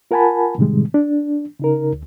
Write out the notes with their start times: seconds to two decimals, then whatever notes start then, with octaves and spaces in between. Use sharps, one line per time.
0.11 F4 A#4 F#5 G#5 A5 B5
0.58 A2 C3 D#3 G3 G#3
0.94 D4
1.60 C#3 D#4 A#4
1.93 D2